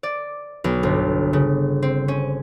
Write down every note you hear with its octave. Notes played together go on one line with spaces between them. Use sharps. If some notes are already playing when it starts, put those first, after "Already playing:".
D5
B1
G1
C#3
C4
C#4